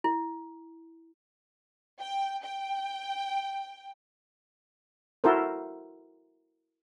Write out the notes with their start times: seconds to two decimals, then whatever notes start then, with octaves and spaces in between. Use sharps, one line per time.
0.04 E4
2.00 G5
2.42 G5
5.24 E4 F#4 A4 A#4 C5